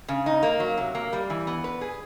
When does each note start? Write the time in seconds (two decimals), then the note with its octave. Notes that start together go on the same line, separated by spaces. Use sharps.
0.08 C#3
0.26 D#4
0.43 A#3
0.60 F#3
0.78 C3
0.95 A#3
1.13 G3
1.30 E3
1.47 B3
1.64 B4
1.81 G#4